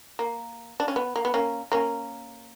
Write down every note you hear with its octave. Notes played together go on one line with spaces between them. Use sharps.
A#3
D4
C#4
B3
A#3
B3
A#3 C#4
A#3 C#4